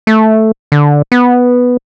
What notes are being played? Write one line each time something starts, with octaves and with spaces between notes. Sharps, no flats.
A3
D3
B3